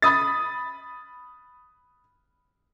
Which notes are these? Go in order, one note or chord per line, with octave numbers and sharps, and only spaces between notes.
B5 D#6 A6